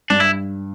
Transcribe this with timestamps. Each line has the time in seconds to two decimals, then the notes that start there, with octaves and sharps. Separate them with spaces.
0.10 G2 D4
0.20 E4